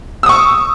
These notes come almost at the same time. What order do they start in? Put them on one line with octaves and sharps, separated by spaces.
E6 D#6 C#6